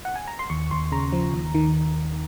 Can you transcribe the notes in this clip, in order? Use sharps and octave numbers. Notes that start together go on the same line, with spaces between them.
F#5
G#5
A#5
C6
D#2 C#6
D#2 C6
C#3 A#5
F3
D#2
D#3